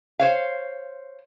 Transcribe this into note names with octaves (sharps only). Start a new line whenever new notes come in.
C5 C#5 F5